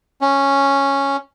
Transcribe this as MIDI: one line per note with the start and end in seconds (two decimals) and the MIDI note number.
0.21 1.17 61